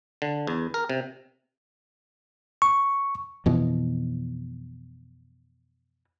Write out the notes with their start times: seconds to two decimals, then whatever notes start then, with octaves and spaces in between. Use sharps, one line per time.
0.22 D3
0.47 E2
0.74 A#4
0.89 C3
2.62 C#6
3.46 F2 B2 E3